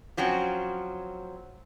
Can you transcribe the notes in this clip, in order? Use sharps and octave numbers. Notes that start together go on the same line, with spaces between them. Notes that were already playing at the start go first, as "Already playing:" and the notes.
F3 F#3 C4 C#4